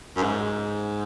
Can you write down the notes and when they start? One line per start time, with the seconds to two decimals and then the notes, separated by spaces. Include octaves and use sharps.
0.17 F#2
0.23 G#2